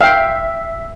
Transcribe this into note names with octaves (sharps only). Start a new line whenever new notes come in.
E5 F5 G5